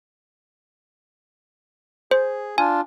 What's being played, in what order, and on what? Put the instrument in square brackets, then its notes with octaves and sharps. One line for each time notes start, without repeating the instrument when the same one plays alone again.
[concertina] G#4 [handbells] C5
[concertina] D4 F4 [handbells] G#5